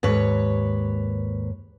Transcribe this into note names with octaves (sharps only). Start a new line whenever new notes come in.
D#2 G#2 B4 C#5